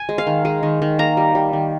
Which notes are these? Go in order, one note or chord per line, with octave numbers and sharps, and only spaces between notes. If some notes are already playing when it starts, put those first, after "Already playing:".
Already playing: G#5
G#3
F5
D#3
G#3
D#3
D#3
A#3 A#5
G3
G3
D#3